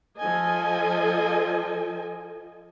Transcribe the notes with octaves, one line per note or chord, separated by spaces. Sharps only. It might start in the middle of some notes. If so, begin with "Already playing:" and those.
F3 A4 D#5 G#5